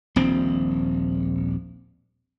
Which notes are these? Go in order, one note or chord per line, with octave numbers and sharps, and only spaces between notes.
D#1 A#1 C4